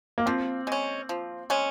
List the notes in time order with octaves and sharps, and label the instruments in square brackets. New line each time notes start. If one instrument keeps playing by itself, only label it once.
[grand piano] A#3
[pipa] F3 [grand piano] C4
[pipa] G#3 C#4
F3
G#3 C#4